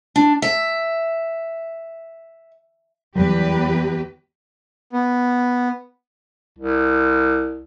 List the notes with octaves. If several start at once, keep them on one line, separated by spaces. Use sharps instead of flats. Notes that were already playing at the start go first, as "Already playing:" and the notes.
D4
E5
E2 F#3 G3 G4 B4
B3
C2